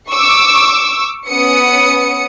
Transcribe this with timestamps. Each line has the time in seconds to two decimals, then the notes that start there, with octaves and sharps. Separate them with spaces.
0.11 C#6 D6 E6
1.28 B3 C#4 D#6 C#7